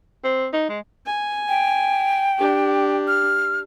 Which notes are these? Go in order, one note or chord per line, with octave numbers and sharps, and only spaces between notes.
C4
D#4
G#3
G#5
G5
D4 G4
F6